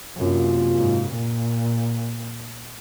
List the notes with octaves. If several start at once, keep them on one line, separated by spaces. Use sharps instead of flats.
F#2 C3 F#3 A#3 F4
G#2
A#2